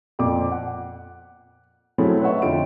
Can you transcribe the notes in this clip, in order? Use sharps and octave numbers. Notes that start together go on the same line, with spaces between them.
F2 A#2 F3 D6
F#5
F#3 A3 C4 C#4 E4 G#4
B4 C#5 D#5 E5 F#5 C#6
F2 D3 D#4 F4 C#5 D7